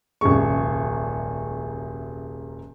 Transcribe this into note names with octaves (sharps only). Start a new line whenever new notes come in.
D#1 C2 F#2 G#3 C#6